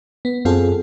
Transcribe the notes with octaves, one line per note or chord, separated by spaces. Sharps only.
B3
F#2 C4 F4 G#4 A4